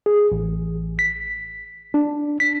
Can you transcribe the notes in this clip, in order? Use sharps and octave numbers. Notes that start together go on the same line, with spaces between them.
G#4
A1
B6
D4
B6